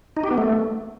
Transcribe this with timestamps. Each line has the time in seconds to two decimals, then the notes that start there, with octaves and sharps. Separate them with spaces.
0.17 D#4
0.24 G4
0.31 B3
0.38 A3